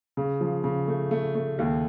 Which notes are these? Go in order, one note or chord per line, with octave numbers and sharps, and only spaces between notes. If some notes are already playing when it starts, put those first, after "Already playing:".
C#3
F3
C#3
A3
A3
A3
D#2